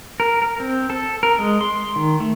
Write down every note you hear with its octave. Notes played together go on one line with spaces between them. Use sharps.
A#4
A#4
C4
A4
A#4
G#3
C6
D#3
A3